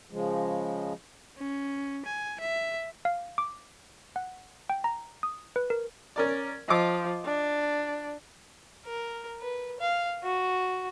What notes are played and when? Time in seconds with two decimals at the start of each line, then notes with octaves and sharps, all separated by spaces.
0.11 C#3 F3 G#3
1.38 C#4
2.06 G#5
2.40 E5
3.05 F5
3.38 D6
4.16 F#5
4.70 G5
4.84 A#5
5.23 D#6
5.56 B4
5.70 A#4
6.16 C#4 A#4 D5
6.68 F3 D#5 D6
7.25 D4
8.85 A#4
9.40 B4
9.80 F5
10.23 F#4